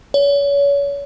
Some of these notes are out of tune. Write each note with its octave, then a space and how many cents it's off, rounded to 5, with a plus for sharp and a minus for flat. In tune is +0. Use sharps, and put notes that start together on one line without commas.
C#5 +35